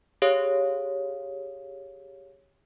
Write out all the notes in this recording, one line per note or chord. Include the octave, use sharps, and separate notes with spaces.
G4 G#4 C#5 F5 D#6